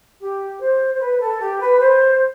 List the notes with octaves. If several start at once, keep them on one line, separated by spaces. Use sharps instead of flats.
G4
C5
C5
B4
A4
G4
B4
C5